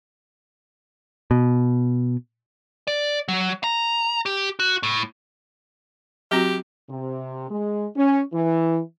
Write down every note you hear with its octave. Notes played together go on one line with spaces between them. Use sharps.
B2
D5
F#3
A#5
G4
F#4
A2
F#3 C4 F#4 G4
C3
G#3
C#4
E3